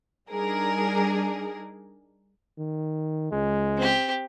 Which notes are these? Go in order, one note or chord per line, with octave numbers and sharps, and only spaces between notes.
G3 D4 D#4 G#4 A#4
D#3
C#2 G#3
C4 G4